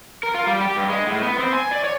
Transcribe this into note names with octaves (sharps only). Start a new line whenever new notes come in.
A#4
F4
G3
G4
G2
G#3
A2
B3
C4
G#5
D5
C#5